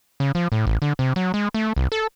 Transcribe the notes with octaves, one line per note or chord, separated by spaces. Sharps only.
C#3
F3
A2
A1
D3
C3
F#3
G#3
A3
C2
A4